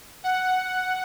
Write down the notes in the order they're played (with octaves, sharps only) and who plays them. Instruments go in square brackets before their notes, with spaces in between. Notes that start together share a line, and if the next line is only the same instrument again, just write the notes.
[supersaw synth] F#5